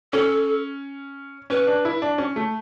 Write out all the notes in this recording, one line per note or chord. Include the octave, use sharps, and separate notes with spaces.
C#4 A4
C#4 B4
D4
E4
D4
C#4
A3